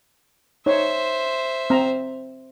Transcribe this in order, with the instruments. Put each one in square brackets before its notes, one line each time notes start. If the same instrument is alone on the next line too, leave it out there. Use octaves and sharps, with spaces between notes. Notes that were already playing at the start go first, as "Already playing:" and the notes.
[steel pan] D#4 C#5 [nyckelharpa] C5 E5
[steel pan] C4 A#5